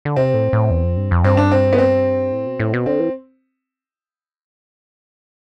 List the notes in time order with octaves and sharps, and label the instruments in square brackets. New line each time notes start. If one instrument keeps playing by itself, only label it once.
[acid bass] D3
[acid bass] C3 [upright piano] C4
[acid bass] A2
A2
E2
F2
G2
F2
[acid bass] G2 [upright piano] C4
[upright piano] D4
C4
B3
C4
[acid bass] A2
B2
A2
B2
[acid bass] D3 [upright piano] C4
[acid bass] E3